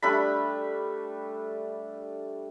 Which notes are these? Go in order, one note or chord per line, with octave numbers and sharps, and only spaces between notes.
G3 A3 D4 B5